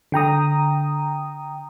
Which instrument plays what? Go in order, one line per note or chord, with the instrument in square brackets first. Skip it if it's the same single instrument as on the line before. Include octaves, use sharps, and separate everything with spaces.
[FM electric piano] D3 G5 A#5 D#6